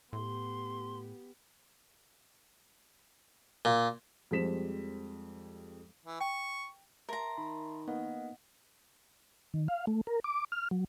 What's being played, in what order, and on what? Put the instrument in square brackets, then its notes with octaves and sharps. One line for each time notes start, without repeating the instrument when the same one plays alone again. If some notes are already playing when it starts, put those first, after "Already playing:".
[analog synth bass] A2 [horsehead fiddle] B3 G4 [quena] C6
[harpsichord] A#2
[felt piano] F2 G3 G#3 C5 B6 E7
[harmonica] E3
[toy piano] G5 [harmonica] C#6
[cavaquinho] A#4 A#5 [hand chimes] E5 A5 C6
[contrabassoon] D#3 [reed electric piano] B5
[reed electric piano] A#3 B3 D#4 [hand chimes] D#5 F5 F#5
[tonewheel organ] D#3
F5
A3
A#4
D6
F6
F#3